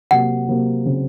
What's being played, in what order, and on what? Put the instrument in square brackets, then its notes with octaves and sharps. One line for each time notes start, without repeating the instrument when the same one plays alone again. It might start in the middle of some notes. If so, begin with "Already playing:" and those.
[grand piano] C3 F#3 A#3 [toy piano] F#5
[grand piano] C3 F#3 A#3
C#3 F#3 C4